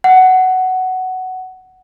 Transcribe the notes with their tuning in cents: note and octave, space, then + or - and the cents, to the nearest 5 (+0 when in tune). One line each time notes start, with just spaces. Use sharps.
F#5 +10